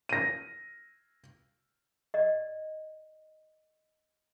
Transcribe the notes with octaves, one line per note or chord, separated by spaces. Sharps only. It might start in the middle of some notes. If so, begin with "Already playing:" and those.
A#6 D#7
D5 D#5